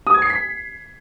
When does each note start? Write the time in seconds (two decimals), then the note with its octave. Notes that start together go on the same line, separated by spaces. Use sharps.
0.07 D#6
0.14 G#6
0.22 C7
0.30 B6